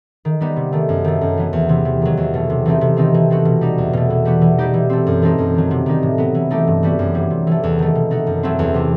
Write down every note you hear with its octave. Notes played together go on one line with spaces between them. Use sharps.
D#3
G3 B3 D#4
C3
D#3 A3
F#2
D#3 A3
F#2
E3 B3
E2
C3 E3
C3
D#3 F#3
E2
B2 A3
C3
E3 A3 C4 D#4
C3
D#3 A3 C4 D#4
E3
A3 C4 D#4 F#4
B2
G3 D#4
E2
B2 A3
E3
G3 B3 F#4
E3
G3 D#4 G4
E3
A3 C4
F#2
E3 A3 C4 D#4
F#2
D#3 F#3
C3
D#3 G3 D#4
A2
F#3 B3
E3
A3 D#4 G4
G2
E3 G3 B3 F#4
F#2
E3 G3
C3
E3 A3
E2
D#3 A3
B2
A3 D#4 F#4
F#2
F#3 A3 C4 E4
E2
C3 E3 B3 E4